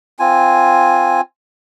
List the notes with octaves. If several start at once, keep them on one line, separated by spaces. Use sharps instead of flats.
C4 F4 G#5